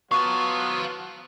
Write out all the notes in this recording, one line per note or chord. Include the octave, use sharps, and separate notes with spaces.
F#3 B3 F4 F5 A5 C#6